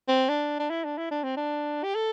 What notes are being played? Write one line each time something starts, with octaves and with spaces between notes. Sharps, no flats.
C4
D4
D4
E4
D4
E4
D4
C4
D4
G4
A4